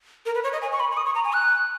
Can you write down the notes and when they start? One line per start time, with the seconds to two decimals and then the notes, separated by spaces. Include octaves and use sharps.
0.26 A#4
0.35 B4
0.44 C#5
0.53 D#5
0.62 G#5
0.72 C#6
0.80 B5
0.92 C#6
0.97 D#6
1.06 C#6
1.15 A#5
1.25 G#5
1.33 F#6